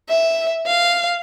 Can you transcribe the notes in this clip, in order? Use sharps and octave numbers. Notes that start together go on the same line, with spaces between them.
E5
F5